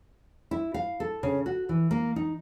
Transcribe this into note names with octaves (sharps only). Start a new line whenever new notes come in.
E4
F5
A4
C#3
F#4
E3
A#3
D#4